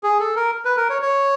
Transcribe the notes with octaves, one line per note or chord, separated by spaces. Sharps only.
G#4
A4
A#4
B4
A#4
C#5
C#5